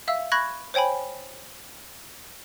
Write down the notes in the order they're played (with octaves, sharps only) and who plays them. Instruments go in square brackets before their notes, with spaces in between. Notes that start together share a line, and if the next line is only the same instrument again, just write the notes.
[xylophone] E5 F5 E6
B5 C#6 F#6 G#6 A#6
C5 C#5 G5 G#5 B5